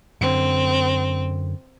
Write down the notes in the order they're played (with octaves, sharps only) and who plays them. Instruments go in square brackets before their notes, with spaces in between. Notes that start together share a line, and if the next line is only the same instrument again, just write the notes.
[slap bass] F#2 D3 [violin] C4